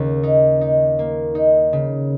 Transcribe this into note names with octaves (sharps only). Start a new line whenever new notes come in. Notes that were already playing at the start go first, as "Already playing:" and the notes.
Already playing: D#2 C#3
D#4
D#4
A#3
D#4
C#3